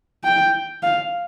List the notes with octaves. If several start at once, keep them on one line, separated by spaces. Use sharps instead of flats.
G5
F5